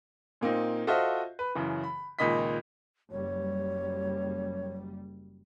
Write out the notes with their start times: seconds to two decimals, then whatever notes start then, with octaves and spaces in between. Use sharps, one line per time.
0.41 A#2 A#3 C4 D#4
0.87 F4 F#4 A4 C5 D#5 E5
1.39 B4
1.55 F#2 C#3 E3
1.83 B5
2.19 C#2 A#2 D#3 D#5 B5 B6
3.11 F#1 G3 C#5